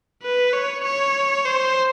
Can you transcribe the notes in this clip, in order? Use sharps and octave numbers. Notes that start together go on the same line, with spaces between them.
B4
C#5
C#5
C5